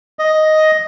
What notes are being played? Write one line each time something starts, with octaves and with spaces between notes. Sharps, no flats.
D#5